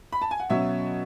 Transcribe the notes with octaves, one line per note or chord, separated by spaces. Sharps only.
B5
A5
G#5
F#5
B2 F#3 C#4 E5